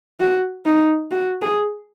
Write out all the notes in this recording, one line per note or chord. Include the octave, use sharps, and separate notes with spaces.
F#4
D#4
F#4
G#4